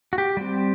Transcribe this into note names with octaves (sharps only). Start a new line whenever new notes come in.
F#4
G4
G3 C4